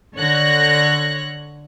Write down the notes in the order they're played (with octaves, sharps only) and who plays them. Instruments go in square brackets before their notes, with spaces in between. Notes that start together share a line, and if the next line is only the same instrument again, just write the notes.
[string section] D3 C#5 F#6 A#6